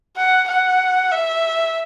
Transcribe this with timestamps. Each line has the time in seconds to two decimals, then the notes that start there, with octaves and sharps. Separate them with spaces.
0.17 F#5
0.48 F#5
1.12 E5